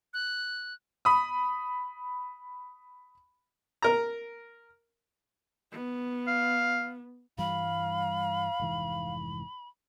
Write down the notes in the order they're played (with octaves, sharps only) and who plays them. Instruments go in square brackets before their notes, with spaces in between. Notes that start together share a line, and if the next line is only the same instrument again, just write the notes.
[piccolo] F#6
[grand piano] B5 D#6
[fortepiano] A#4 A#5
[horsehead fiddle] B3
[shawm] F5
[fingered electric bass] G2 E3 G3 [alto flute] F5 [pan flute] B5
[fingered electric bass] F1 G#2 E3